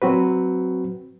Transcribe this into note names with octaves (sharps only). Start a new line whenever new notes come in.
F#3 C4 F#4 B4